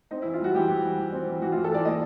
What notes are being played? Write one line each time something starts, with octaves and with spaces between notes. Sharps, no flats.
C4 D#4
E4
E3
F4
G3 F#4
E3 G4
E3
G3
E3
C4
E3
E3 F#4
F4
E3
A4
E3 D5
A#3 D#5